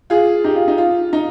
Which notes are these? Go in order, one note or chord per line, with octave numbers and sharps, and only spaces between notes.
F4 G#4
D#4 G4
F4
D#4
F4
D#4